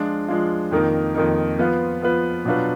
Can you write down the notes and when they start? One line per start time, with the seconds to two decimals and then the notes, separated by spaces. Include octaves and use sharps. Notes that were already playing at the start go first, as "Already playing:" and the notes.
Already playing: F3 G#3 D4 F4
0.28 F3 G#3 D4 F4
0.71 F2 D#3 A#3 D#4 A#4
1.15 F2 D#3 A#3 D#4 A#4
1.58 F3 B3 F4 B4
2.02 F3 B3 F4 B4
2.45 B2 F#3 D4 F4 B4